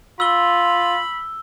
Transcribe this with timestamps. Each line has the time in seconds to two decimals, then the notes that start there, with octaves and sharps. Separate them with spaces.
0.20 F4 B5 E6 G7